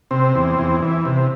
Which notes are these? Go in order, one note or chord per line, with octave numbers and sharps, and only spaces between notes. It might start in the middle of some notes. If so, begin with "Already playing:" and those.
C3 C4
E2
E2
E3
C3